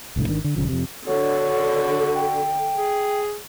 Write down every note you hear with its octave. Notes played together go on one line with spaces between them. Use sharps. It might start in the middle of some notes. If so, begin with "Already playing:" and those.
D1 C2 A2 D3
G#1 D#3 D4
D3
D#1 C#3 F3
F2 C3
D3 F#4 C#5
G5
G#4